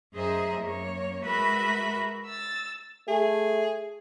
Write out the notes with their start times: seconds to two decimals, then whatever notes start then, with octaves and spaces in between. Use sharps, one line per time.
0.14 F#2 G#4 C5 D#5 E5 A#5
0.60 F#2 A#3 C#5
1.24 G#3 F#4 A#4 B4 E5 B5
2.27 E6 A6
3.08 A3 G#4